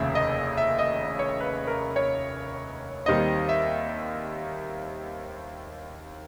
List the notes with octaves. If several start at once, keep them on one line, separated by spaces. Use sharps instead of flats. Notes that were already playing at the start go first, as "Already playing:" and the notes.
Already playing: F1 D#2 C#3 E5
D#5
E5
D#5
C#5
B4
A#4
C#5
D#2 D#3 G3 C4 D#5
E5